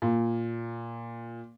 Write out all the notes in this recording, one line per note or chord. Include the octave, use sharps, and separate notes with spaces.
A#2